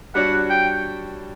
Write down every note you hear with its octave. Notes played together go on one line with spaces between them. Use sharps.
G3 D4 F#4 C#5 F#5
G5